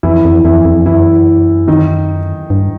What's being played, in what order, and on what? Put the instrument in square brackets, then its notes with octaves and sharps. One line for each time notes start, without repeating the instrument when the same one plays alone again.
[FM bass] F2 [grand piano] E3 E4
[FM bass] F2
[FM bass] F2 [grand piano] E3 E4
[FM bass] F2
[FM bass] F#2 [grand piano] E3 E4
[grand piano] D#3 D#4
[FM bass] G2